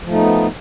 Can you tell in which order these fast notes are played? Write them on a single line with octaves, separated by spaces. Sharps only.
F3 A3 D#4 B3